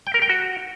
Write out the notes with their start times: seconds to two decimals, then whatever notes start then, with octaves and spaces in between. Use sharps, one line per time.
0.07 G5
0.14 A#4
0.22 G5
0.29 F#4